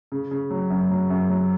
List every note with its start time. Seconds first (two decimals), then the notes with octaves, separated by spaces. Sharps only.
0.12 C#3
0.31 C#3
0.50 F#3
0.70 F#2
0.90 F#3
1.10 F#2
1.29 F#3